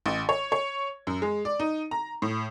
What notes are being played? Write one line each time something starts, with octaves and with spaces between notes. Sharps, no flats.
A1
C#5
C#5
F#2
G#3
D5
D#4
A#5
A2